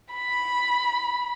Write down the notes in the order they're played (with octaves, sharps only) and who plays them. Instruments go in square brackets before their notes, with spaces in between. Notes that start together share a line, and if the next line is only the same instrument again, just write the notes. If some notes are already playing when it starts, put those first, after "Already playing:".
[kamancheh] B5